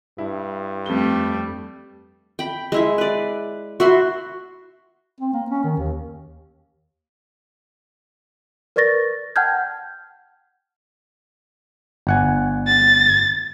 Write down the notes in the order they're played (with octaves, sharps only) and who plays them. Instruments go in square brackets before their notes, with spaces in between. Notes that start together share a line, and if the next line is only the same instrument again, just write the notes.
[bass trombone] G2 [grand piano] E4
[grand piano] F2 G7 [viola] G3 A3
[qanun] G5 B5
G#3 E4 E5
B4 D5
F#4 E5 B5 C6
[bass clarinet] C4
A#3
C#4
D#3
D#2
[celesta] A#4 B4 D5 C#6 A6 A#6
F#5 G5 A5 F6 G6 G#6
[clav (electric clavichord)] G1 F#5 G#5
[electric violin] A6